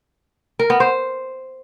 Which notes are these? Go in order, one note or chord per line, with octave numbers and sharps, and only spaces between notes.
A#4
B3
C5